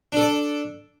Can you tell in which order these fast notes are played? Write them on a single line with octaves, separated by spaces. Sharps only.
D4 A4 D5